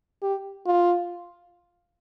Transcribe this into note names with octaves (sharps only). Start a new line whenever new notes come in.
G4
F4